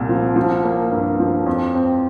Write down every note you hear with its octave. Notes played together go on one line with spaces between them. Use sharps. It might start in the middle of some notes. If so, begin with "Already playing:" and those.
Already playing: C2 A#2
F3
F3
A#3
G2
F3
F2
C4